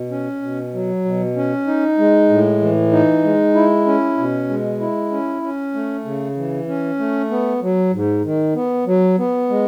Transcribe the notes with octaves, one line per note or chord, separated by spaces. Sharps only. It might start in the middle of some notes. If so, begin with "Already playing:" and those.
Already playing: B2
C#4
B2
F#3
B2
C#4
D#4
G#3
A2
E3
D#4
G#3
E4
C#4
B2
G#3
E4
C#4
C#4
A3
C#3
E3
C#4
A3
B3
F#3
G#2
D#3
B3
F#3
B3
G#3